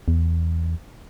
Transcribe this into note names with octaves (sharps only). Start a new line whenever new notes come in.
E2